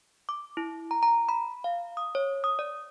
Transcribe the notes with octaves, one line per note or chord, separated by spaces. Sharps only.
D6
E4
A#5
A#5
B5
F5
D#6
C#5
D#6
D5